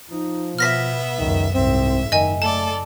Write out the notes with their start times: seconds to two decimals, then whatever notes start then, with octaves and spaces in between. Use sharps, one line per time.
0.10 F3 D#4
0.59 B2 B3 E5 F6 A#6 B6
1.18 C#2 F#2 D#3
1.54 C2 G#2 C4 E5
2.12 F#1 D#3 D#5 G#5
2.42 A3 A4 D5 A5